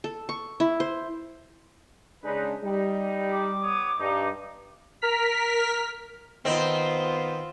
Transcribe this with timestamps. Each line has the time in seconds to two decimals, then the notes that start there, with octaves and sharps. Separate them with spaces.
0.04 A4
0.29 C#6
0.60 E4
0.80 C5
2.23 C#3 G#3 D4 D#4 B4
2.62 G3 D#4
3.32 D6
3.62 B3 C#5 D#6
3.99 G2 D#4
5.02 A#4 F6 B6
6.45 D#3 B3 C4 D#4 F4 C5